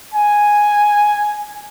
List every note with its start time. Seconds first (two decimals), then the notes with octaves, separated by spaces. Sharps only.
0.14 G#5